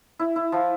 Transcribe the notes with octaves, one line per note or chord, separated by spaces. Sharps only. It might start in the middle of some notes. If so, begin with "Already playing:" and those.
E4
E4
F3